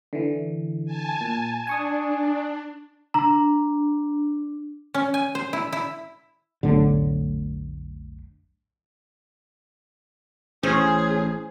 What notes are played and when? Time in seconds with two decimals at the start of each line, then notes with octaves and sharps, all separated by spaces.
0.13 D3 E3
0.86 G#5 A5
1.21 A#2
1.67 D4 G#5 C#6 D#6
3.14 D4 A#5
4.94 C#4
5.14 G#5
5.35 C5
5.53 E4
5.72 E4
6.63 F1 B1 A2 D3
10.63 A1 C#4 G#4 C5